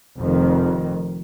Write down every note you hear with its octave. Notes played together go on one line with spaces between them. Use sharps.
F1 F2 D#3